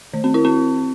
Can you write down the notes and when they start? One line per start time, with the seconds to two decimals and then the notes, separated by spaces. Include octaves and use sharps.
0.13 D#3
0.24 C4
0.34 E4
0.45 C4